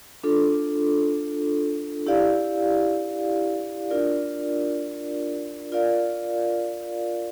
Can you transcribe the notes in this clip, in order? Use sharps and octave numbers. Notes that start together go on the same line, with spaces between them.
D4 F4 A4
E4 G4 D5 F5
D4 F4 A#4 D5
F4 A#4 D5 F5